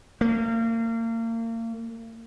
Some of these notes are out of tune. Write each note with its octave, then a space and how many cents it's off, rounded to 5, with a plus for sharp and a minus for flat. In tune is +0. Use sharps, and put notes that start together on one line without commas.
A#3 -35